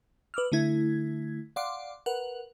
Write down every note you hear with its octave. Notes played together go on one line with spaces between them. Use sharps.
B4 D6 E6 F6
D3 A3 E4 G#6
D5 F5 F#5 C6 D6
A#4 B4 F#5